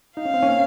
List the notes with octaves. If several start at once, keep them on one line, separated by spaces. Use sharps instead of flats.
D#4 F5
C#4
C4
A#3 C#4